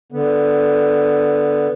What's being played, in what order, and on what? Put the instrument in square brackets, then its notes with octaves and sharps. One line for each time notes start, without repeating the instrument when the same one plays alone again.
[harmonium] D3 B3